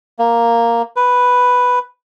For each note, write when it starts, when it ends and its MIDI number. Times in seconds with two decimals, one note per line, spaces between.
0.19 0.82 58
0.96 1.79 71